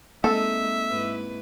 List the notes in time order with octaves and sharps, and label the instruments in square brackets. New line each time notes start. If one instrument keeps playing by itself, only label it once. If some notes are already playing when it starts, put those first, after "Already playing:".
[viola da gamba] G#3 D#4 [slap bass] A#3 C4 [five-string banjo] A4 [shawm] E5
[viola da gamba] G#2 E4 B4